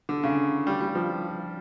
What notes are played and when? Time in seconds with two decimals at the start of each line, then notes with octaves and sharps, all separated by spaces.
0.09 D3
0.23 C#3
0.67 G3
0.81 G3
0.95 F3